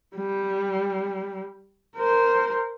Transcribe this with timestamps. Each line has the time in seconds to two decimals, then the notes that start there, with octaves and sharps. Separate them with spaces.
0.16 G3
1.97 A#4 C5